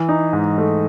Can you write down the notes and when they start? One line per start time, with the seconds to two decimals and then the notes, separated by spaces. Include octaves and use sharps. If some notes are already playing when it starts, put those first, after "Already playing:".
Already playing: E3
0.09 D#4
0.33 G#2
0.58 A3